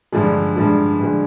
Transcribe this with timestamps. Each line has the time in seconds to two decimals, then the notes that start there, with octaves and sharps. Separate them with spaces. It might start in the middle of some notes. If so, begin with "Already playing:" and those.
0.12 G2 D3 F3 G#3
0.57 G2 D3 F3 G#3
1.00 G2 D3 F3 G#3